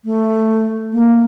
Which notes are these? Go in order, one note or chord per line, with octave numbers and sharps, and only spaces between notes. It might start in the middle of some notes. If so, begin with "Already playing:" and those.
A3
A#3